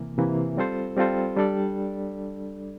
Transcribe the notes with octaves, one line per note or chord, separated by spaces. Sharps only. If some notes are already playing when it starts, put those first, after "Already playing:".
Already playing: C3 E3 A#3
C3 E3 A#3
G3 C4 F4 A4 C5
G3 C4 F4 A4 C5
G3 D4 A4 D5